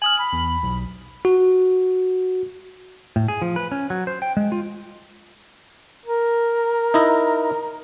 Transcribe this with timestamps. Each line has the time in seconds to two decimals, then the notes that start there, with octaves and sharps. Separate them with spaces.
0.02 G#5 D#6 F6 F#7
0.19 B5
0.33 E2
0.63 B1
1.25 F#4
3.16 A2
3.28 G#4
3.42 F3
3.56 B4
3.72 C#4
3.90 F#3
4.07 C5
4.22 G5
4.37 G#3
4.52 F4
6.06 A#4
6.94 D#4 E4 D#5